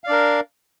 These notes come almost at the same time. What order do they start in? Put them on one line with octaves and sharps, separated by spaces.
F5 D5 D4 A#4